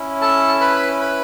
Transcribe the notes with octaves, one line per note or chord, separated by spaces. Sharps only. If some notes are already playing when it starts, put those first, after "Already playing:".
Already playing: C#4 E4
A4 A5
B4 B5
B4 B5